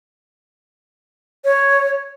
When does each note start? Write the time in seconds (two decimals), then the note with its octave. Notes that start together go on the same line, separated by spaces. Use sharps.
1.44 C#5